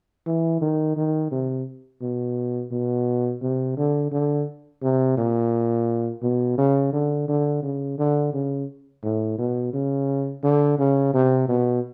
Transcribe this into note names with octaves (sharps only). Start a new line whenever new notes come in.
E3
D#3
D#3
C3
B2
B2
C3
D3
D3
C3
A#2
B2
C#3
D3
D3
C#3
D3
C#3
A2
B2
C#3
D3
C#3
C3
B2